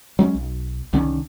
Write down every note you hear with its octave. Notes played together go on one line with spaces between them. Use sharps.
F#3 G#3 A#3 C#4
B1
C2 D3 D#3 C#4